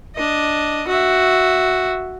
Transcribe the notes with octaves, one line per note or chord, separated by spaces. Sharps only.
D4 D#5
F#4 E5